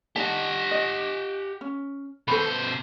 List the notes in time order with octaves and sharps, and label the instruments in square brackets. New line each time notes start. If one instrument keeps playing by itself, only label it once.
[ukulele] D#4 D#5 A5 [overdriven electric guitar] G4 F#5
[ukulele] D#5
C#4
[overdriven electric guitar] B2 C5 [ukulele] A4 B4